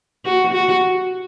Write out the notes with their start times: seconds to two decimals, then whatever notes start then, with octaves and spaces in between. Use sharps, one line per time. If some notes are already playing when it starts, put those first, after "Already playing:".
0.25 F#4
0.53 F#4